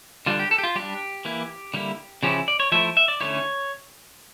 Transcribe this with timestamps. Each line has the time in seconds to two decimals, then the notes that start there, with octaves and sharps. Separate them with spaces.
0.26 D3 G3 D4 F4
0.39 G4
0.51 A4
0.58 G4
0.64 F4
0.75 G3 D4 G4
1.25 E3 A#3 E4
1.74 D3 G3 A#3 E4
2.23 C#3 F3 C#4 E4 G4
2.48 D5
2.60 C#5
2.72 F3 A3 E4 E5
2.97 E5
3.08 D5
3.20 D3 A3 C#4 E4 C#5